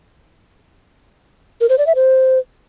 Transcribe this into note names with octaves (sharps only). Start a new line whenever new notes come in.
A#4
C5
D5
E5
C5